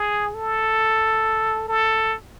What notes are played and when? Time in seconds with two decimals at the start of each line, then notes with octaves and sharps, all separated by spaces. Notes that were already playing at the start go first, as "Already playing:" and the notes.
Already playing: G#4
0.34 A4
1.68 A4